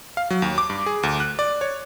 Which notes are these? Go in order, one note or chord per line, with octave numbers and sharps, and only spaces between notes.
F5
F#3
D#2
D6
G2
G#4
D2
F#6
D5
C#5